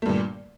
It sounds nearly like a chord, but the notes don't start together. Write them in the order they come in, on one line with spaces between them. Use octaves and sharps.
A3 G2 A#2